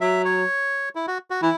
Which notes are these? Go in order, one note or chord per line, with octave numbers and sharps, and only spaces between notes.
F#3 E5
C#5
E4
F#4
F#4
E3 E4